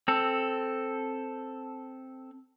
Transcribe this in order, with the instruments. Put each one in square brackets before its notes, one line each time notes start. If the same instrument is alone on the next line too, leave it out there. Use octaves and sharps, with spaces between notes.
[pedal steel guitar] C4 A4